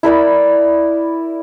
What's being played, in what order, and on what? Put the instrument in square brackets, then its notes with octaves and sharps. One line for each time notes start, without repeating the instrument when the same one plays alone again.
[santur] E4 A#4 D5 B5